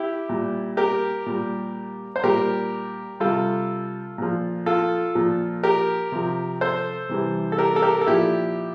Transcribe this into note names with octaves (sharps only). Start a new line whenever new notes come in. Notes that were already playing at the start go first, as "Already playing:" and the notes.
Already playing: E4 G4
A#2 G3
G4 A#4
A#2 G3
C5
A#2 G3 G4 A#4
C3 G3 F4 A4
A#2 F3
F4 A4
A#2 F3
G4 A#4
C3 F3
A4 C5
C3 E3 G3
A4
G4 A#4
A4
G4 A#4
A4
A#2 F3 E4 G4